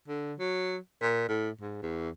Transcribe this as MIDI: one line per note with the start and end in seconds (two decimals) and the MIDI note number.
0.08 0.33 50
0.39 0.77 54
1.02 1.27 46
1.29 1.49 45
1.61 1.80 44
1.82 2.09 40